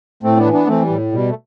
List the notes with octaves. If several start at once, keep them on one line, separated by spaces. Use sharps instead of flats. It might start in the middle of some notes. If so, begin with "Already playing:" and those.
A2 A3 C4
B3 D4
E3
B3 D4
E3 A3 C4
G3
A2
B2 G3
A3